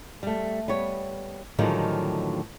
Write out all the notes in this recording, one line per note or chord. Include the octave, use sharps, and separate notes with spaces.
G3 A3
G3 B3 C#5
A2 D3 D#3 F3 F#3 G#3